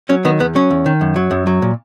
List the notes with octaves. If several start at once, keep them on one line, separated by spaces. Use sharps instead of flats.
F#3 C#4
D#3 B3
E2 B3
F#3 C#4
E2
D#3
F#2
F#3
F#2
F#3
A#2